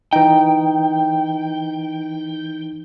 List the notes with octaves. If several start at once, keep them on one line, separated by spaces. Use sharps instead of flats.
E3 D#4 G5